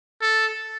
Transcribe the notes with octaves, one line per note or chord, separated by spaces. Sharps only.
A4